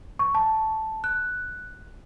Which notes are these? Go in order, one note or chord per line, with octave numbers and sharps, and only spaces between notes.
C#6
A5
F#6